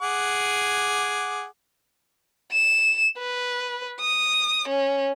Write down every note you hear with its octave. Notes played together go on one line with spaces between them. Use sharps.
G#4 F#5 D6
E7
B4
D#6
C#4